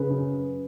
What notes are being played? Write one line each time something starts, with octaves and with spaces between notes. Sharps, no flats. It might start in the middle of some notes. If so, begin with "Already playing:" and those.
Already playing: C#3 B4
F#2